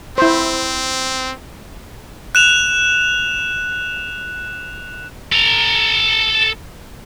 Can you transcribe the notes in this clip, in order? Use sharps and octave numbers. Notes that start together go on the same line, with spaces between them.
C4 E4 C5
F#6 E7 F7
A4 A#5